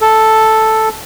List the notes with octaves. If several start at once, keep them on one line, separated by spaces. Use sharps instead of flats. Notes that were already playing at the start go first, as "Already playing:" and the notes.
A4